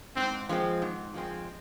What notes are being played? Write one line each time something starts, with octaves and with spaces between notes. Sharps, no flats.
G#2 C4
F3 G#3 C4
G#2
F3 G#3 C4